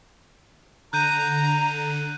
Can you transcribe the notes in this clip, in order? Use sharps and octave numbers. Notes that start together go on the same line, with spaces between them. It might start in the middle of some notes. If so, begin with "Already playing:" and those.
D3 A#5 F#6 G6 D#7